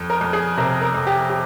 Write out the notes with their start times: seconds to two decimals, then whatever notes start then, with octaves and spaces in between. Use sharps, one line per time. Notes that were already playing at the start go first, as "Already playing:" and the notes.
Already playing: F2
0.10 A#4
0.21 F2
0.33 G#4
0.57 C3 A#4
0.82 A#4
0.94 F2
1.07 G4
1.30 G4